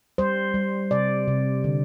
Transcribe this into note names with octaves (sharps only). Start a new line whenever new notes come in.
G3 C5
G3
C3 D5
C3
D3